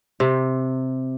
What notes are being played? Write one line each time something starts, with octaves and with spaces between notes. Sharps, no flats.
C3